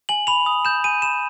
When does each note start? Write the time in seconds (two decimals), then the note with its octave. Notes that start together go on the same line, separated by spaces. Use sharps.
0.09 G#5 F#7
0.27 B5 F7
0.46 D#6
0.65 G6 E7
0.84 G#5 D#7
1.02 B5 E7